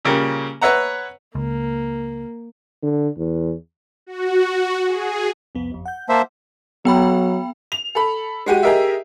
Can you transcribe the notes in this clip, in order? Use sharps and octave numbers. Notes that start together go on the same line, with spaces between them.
A#2 C#3 G3 A#3
B4 C#5 E5 F#5 A#5
C#2 A#3
D3
E2
F#4
G#4
C2 F2 B3
G1 F2
F#5 G6
A#3 C5 E5 A5
F#3 B3 G5 B5
F7
A4 B5
G#3 F#4 G4 D#7
G4 G#4 A#4 D#5 E5